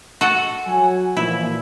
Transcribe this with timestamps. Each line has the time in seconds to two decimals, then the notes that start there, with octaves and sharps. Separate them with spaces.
0.21 F#4 A4
0.67 F#3 G#5
1.17 A#2 E3 F3 E4